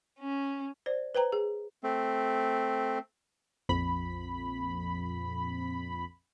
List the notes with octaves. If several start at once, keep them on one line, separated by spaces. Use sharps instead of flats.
C#4
C5 D5
B4 C5 G5 A#5
G#4
A3 C4
A#1 F2 B5